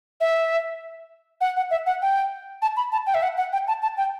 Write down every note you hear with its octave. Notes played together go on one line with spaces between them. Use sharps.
E5
F#5
F#5
E5
F#5
G5
A5
B5
A5
G5
E5
F#5
F#5
G5
A5
A5
G5